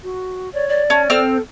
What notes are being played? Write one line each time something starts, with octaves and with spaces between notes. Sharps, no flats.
F#4
C#5 D5
D5
C#4 A5
C4 A4 F6